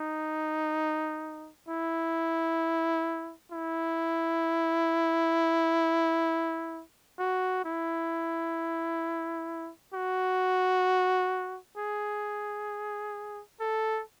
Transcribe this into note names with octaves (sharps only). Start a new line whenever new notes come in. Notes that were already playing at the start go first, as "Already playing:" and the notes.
Already playing: D#4
E4
E4
F#4
E4
F#4
G#4
A4